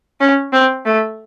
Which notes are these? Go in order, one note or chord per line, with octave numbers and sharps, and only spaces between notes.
C#4
C4
A3